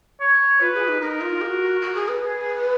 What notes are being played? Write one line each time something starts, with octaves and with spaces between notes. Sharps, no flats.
C#5
F4 B4
G#4
D#4
D#4 A#4
F4
G#4
F#4
F#4
G#4
B4
G#4